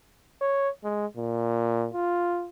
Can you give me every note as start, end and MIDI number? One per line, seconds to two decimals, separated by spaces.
0.41 0.69 73
0.84 1.06 56
1.17 1.89 46
1.94 2.49 65